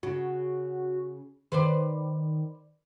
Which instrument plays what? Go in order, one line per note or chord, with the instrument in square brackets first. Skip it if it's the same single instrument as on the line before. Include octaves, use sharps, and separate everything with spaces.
[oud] C#3 [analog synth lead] F#4
[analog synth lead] D#3 [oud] B4 C5 D5